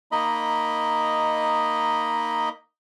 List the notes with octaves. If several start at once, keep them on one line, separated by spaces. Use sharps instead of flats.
A#3 D#4 D#5 B5